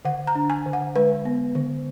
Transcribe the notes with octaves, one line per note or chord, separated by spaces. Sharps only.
D3 F#5
A#5
D4
G#5
D3
F#5
G#3 B4
B3
D3